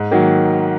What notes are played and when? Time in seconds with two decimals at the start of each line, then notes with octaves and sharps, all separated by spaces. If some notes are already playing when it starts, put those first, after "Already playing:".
Already playing: G#2
0.11 D#3 F#3 A#3